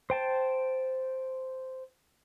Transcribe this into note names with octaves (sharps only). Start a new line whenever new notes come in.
C5 G5 A5